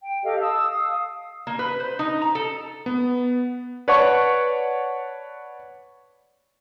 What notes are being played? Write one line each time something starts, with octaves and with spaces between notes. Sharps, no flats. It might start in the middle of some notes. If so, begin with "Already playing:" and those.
G5
G4 A4 D#5 F5
A5 D#6 E6
F5 D#6
A#3
B4
C5
D#4
A#5
A4
B3
B4 C#5 D5 F#5 A5 C#6